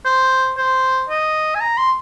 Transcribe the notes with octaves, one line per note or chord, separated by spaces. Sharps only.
C5
C5
D#5
G#5
A#5
C6